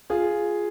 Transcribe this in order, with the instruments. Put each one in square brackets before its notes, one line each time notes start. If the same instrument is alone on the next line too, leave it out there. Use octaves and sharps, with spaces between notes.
[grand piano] F4 G#4